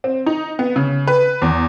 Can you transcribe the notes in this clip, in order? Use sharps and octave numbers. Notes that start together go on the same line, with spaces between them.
C4
D#4
B3
C#3
B4
E2